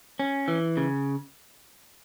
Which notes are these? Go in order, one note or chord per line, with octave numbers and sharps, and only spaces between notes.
C#4
E3
C#3